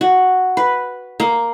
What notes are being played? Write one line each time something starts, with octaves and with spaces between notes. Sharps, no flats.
F#4
B4
A#3